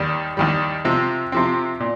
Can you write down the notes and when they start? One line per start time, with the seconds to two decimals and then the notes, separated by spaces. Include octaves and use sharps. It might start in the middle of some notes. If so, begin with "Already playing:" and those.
Already playing: D#2 D#3 G3
0.37 D#2 D#3 G3
0.85 C3 F3 C4
1.32 C3 F3 C4
1.80 A#2